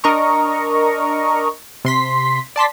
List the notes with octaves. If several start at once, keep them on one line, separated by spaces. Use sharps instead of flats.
D4 A#4 D#5 A#5 C#6
C3 C6 B6
D5 A5 C6 B6